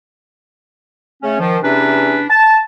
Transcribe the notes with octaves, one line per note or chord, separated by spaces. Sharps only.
C#3 A3 C#4
D#3 F3
E2 C3 C#4 D4 B4
A5